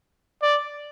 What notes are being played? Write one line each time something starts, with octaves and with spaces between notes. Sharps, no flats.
D5